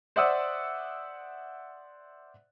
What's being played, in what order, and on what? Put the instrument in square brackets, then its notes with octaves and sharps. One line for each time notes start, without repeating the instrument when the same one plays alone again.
[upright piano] C5 D5 E5 F#5 D#6 E6